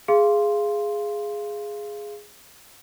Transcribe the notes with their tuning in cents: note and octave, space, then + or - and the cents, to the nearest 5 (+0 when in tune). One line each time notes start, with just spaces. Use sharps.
G#4 +0 F5 -20 C6 +0